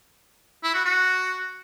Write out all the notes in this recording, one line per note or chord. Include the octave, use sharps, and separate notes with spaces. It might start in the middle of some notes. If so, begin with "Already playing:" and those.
E4
F#4
F#4